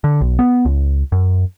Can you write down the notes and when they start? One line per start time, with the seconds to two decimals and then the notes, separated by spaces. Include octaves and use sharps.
0.04 D3
0.21 B1
0.39 B3
0.65 C#2
1.12 F#2